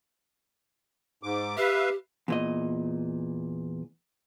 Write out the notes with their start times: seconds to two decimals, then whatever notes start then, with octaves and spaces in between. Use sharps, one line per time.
1.23 G#2 D6
1.57 G4 B4 E5 F5
2.28 E2 A#2 D#5